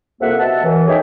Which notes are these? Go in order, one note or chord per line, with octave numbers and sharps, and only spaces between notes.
C2 F2 F3 A#3 E5 F#5
B2 D#5 E5 F#5 A5
F#2 E3
A3 D#4 G#4 C#5 E5 G5